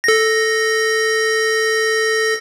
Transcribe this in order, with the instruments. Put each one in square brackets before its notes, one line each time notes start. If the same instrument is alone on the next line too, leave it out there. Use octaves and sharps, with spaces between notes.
[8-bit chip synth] A4 A#6